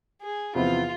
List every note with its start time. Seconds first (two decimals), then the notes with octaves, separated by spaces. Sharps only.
0.21 G#4
0.55 E2 C3 F3 B3 E4 F4